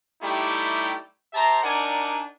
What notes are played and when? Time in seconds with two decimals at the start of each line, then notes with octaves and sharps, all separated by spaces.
0.22 G3 A3 D#4 E4 G4
1.34 G4 C5 E5 A5 A#5
1.63 D4 D#4 A#4 D5 F#5 G#5